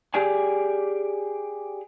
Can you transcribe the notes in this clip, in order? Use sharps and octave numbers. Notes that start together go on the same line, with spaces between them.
G4 G#4 D5 G#5